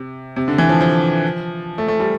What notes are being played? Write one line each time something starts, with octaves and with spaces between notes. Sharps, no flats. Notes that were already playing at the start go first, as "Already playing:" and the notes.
Already playing: C3
C3
D3
E3
F3
F3
A3
A3
G3